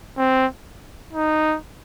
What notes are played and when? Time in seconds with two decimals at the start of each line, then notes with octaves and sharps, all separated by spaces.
0.17 C4
1.13 D#4